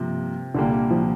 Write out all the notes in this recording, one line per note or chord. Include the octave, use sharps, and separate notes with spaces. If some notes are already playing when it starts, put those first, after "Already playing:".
Already playing: G2 C3 F3 A#3
C2 A#2 D3 G3 A#3
F3